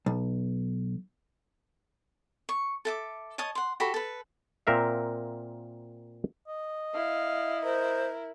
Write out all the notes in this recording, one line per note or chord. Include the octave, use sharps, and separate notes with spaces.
B1
C#6
A4 E5 D6
C#5 D#5 A5 D#6
F#5 C6
F#4 G4 A4 B5
A4 B4
A#2 C4 A#4 E5 F5
D#5
E4 F5
A#4 C5